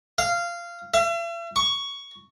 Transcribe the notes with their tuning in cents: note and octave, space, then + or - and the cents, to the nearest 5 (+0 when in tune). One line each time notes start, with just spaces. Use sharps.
F5 -15
E5 +45
C#6 +10